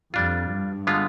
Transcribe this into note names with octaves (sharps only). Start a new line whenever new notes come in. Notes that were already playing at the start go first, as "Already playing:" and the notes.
F2 G3 D4 F4
G2
D3 G#3 B3 F4